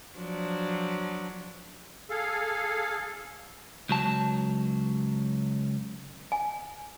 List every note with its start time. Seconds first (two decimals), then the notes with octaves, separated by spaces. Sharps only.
0.17 F3 F#3 D4
2.10 G#4 A4 F5
3.89 C#2 F#3 A5
6.32 G#5